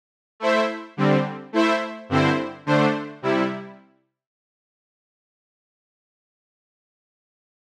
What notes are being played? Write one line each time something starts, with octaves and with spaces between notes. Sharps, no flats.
A3 E4 C5 E5
D3 G3 C4
A3 E4 C5 E5
G2 D3 C4 E4 C5
D3 A3 D4 C5
C3 G3 E4